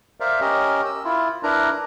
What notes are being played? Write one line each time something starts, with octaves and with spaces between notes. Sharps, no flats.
A#4 C5 D5 E5 F5
C#4 G4 A#4 D#5
E6
E4 F4
D4 E4 A#4 B4 A#5